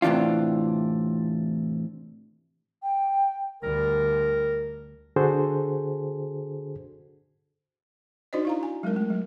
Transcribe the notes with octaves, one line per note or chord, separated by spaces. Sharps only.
A2 C3 E3 D4 F4
G5
D2 G3 A#4
D3 D4 F#4 G#4 A4 C5
D4 D#4 F#4 C5 D5 D#5
E4 F5 A#5
G#5
F#3 G#3 C4 A#4
A3
F#3